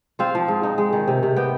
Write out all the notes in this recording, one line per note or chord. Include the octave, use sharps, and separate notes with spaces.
C4 F4 F5
F3
G#2
D#4
G#3
D#3
C3
C3
B3 G4 G5